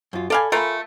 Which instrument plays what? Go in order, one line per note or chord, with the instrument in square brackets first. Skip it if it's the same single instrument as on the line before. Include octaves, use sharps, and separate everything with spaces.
[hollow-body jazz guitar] F#2 F4
[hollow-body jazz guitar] A4 B5 [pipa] D5 F5 G#5
[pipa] A3 F4 A#4 [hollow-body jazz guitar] A4 G#5 B5